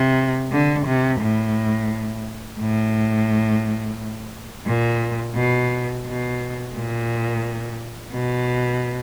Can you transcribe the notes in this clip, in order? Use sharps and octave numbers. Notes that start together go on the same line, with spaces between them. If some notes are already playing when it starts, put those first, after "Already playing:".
Already playing: C3
D3
C3
A2
A2
A#2
B2
B2
A#2
B2